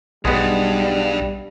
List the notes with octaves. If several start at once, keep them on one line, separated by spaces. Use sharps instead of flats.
B1 E2 G2 G3 G#3 B3